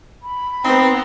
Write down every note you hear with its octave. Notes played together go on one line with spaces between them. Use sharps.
B5
B3 C4 D#4 C5 A#5